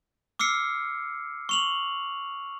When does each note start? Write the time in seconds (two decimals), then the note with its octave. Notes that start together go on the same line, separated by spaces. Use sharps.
0.39 D6 E6 F6 C7 C#7
1.49 C#6 F7 F#7